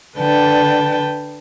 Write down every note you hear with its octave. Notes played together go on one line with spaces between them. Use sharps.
D3 B4 G5 A5